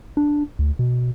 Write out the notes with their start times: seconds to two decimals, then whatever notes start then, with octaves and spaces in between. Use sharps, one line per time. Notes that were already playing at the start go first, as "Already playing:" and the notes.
0.17 D4
0.59 D2
0.79 B2